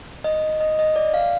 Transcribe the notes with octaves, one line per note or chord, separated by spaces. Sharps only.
D#5
D#5
D#5
D5
F5